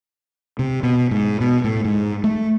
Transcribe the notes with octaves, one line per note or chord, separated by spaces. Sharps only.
C3
B2
G#2
B2
A2
G#2
A3